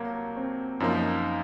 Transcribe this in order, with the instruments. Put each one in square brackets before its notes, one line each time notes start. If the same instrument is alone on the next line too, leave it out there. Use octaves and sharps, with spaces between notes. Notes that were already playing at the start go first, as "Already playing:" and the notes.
Already playing: [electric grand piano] C2 F#3 [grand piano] A#3
[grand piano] C4
[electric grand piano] F#2 F3 A#3 [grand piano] D#4
[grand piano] F4
D#4